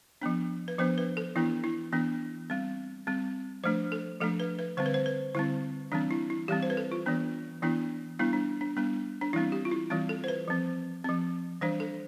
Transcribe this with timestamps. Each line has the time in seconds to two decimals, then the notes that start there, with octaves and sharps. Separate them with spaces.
0.22 F3 B3 D4
0.68 B4
0.79 F3 B3 D4 C5
0.98 B4
1.17 A4
1.36 E3 B3 D4 E4
1.64 E4
1.92 E3 B3 D4
2.50 G3 C4
3.07 G3 C4
3.64 F3 A3 D4 C5
3.92 A4
4.21 F3 A3 D4 A4
4.40 B4
4.59 B4
4.77 D3 G3 C4 C5
4.86 B4
4.94 C5
5.06 B4
5.35 D3 G3 C4 E4
5.92 E3 G3 C4 D4
6.11 E4
6.30 E4
6.48 E3 G3 C4 G4
6.62 C5
6.70 B4
6.77 A4
6.92 F4
7.06 E3 B3 D4
7.62 E3 B3 D4 E4
8.19 G3 B3 D4 E4
8.33 D4
8.61 D4
8.76 G3 B3 D4
9.21 D4
9.33 E3 G3 C4 E4
9.52 G4
9.65 F4
9.71 E4
9.90 E3 G3 C4 F4
10.09 A4
10.24 C5
10.28 B4
10.48 F3 C4
11.04 F3 C4
11.61 E3 G3 D4 C5
11.80 A4